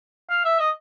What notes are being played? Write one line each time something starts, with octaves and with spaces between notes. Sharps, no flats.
F5
E5
D#5